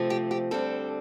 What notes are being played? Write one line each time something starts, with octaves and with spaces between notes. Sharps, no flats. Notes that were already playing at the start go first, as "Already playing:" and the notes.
Already playing: C3 F3 A3 C4
G4
G4
D2 D3 G3 C4 A4